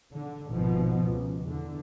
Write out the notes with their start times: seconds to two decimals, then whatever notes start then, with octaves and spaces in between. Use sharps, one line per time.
0.13 D3
0.48 G#1 B2 F3
1.06 C#2
1.44 E2 D3